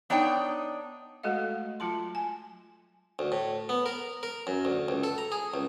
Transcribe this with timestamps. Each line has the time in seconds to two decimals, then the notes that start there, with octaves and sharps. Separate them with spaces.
0.10 B3 D4 D#4 C#5 G5
1.23 G#3 A3 F#4 A4 D#5 F5
1.80 F#3 F4 A5 C6
2.15 G#5
3.19 D2
3.32 A2
3.69 B3
3.86 A#4
4.23 A#4
4.47 F#2
4.65 D2
4.88 C#2
5.04 A4
5.18 A#5
5.32 G#4
5.54 C#2